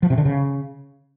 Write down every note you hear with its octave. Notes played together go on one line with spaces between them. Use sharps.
F3
C3
D3
C#3